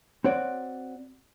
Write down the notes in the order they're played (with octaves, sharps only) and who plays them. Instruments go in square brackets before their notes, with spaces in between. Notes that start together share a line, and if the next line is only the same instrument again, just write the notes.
[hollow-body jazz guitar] C4 F#4 C#5 D5 F#5